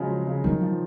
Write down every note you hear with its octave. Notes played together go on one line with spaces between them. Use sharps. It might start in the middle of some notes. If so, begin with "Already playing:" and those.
Already playing: C#3 F3 F#3 G#3
C#3
D#3 F#3
F3